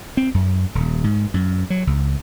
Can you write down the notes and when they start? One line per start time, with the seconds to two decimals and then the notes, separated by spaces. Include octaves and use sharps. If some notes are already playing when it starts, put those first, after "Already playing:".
0.17 C4
0.34 F#2
0.75 D#1
1.04 G#2
1.34 F#2
1.70 F#3
1.87 C#2